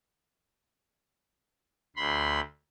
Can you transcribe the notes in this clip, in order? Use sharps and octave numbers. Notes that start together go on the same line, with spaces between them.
D2 B5 C6